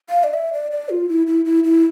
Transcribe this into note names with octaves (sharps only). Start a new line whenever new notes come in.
F5
D5
E5
D5
D5
F4
E4
E4
E4
E4